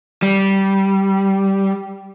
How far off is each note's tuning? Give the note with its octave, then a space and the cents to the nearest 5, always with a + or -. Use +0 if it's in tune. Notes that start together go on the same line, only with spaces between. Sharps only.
G3 -10